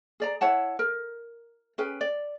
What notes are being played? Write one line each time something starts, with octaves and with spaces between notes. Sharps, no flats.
G#4 D5 A#5
E4 C#5 F#5 A5
A#4
C#4 G#4 B4 G5
D5